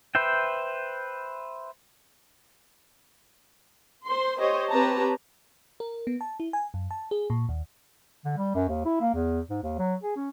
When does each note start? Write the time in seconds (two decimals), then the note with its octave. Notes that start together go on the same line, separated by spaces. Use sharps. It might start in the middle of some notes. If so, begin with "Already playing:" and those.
0.15 B4 C5 E5 G5
4.05 C5 C6
4.38 G4 C5 C#5 D#5
4.70 C4 G4 B4 C#5 A5 A#5
5.80 A#4
6.07 B3
6.21 A5
6.40 E4
6.53 G#5
6.74 F#2
6.91 A5
7.11 G#4
7.30 A#2
7.49 D#2
8.25 D3
8.38 G3
8.55 F#2
8.68 D#2
8.86 E4
9.01 A#3
9.14 E2
9.50 G#2
9.63 D#2
9.79 F#3
10.03 G#4
10.16 C#4